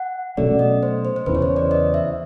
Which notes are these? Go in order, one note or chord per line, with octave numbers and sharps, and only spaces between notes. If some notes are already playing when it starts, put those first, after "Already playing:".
Already playing: F#5
B2 F#3 A3 C#4 D5
D#5
C5
C5
C5
E2 C#3 E3 B4
C#5
C5
D5
D#5
E5